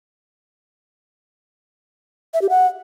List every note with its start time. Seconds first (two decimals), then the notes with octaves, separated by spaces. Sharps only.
2.34 E5
2.42 G4
2.50 F#5